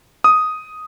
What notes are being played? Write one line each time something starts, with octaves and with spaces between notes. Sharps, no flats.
D#6